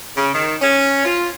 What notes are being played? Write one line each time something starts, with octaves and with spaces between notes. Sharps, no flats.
C#3
D#3
C#4
F4